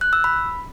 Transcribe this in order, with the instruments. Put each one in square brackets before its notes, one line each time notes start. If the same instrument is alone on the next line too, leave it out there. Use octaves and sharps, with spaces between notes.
[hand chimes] F#6
E6
B5